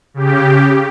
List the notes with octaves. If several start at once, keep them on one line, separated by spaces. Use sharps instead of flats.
C#3 G4